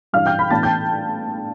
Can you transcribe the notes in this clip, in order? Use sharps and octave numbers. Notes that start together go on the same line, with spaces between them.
G2 E3 G3 D4 F5 F6
G5 G6
B5 B6
A2 E3 B3 D4 A5 A6
G5 G6